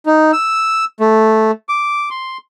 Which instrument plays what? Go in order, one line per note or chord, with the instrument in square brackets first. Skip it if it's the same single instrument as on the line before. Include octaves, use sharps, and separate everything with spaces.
[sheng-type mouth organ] D#4
E6
A3
D6
C6